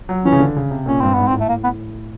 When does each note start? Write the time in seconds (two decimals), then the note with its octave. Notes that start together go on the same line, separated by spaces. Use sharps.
0.09 F#3
0.25 E3 C#4
0.32 C#3
0.40 D3
0.56 C#3
0.71 C3
0.86 A#2 C#4
1.01 G2 C4
1.14 G#2 B3
1.28 C4
1.33 A2
1.40 A3
1.49 A#3
1.64 B3